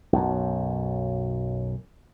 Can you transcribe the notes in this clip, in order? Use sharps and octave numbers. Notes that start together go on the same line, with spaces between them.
B1 F#2